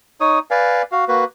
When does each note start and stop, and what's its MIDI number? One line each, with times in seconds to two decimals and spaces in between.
0.21 0.39 63
0.21 0.39 73
0.21 0.39 87
0.51 0.82 71
0.51 0.82 74
0.51 0.82 77
0.51 0.82 80
0.92 1.05 66
0.92 1.05 77
1.08 1.24 58
1.08 1.24 66
1.08 1.24 71